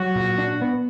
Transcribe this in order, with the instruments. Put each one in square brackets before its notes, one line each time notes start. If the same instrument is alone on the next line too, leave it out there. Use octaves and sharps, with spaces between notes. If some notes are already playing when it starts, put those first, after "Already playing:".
Already playing: [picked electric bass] F#3 [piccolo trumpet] F#4
[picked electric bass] A#2
D4
B3